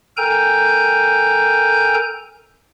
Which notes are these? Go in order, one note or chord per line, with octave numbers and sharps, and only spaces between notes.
A4 A#4 G5 G#5 A#5 G6